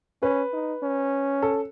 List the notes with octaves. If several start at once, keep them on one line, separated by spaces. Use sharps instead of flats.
C#4 B4
D#4
C#4
A4